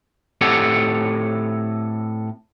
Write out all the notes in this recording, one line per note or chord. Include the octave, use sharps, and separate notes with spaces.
A2 C4 G4 A4 C#5 F#5